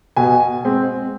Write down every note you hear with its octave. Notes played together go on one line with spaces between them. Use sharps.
B2 G#5
G#3 C4